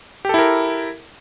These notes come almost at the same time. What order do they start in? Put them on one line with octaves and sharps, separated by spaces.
G4 A4 E4 A#4